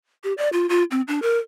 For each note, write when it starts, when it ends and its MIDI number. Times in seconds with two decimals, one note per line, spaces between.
0.24 0.33 67
0.38 0.49 74
0.53 0.69 65
0.69 0.84 65
0.91 1.01 60
1.08 1.20 62
1.22 1.38 70